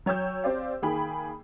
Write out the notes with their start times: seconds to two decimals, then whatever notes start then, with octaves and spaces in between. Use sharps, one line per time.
0.06 F#3 C#5 G5 E6 G6
0.44 C4 G4 C5 D5 F5
0.82 D#3 A#3 G#4 G5 B5